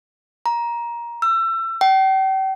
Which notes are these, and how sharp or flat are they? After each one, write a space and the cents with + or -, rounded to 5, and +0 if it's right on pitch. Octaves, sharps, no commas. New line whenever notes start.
A#5 +15
E6 +30
G5 -40